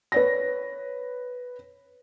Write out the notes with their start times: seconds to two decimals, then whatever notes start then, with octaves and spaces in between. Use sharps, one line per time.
0.12 B4 C#5 A#6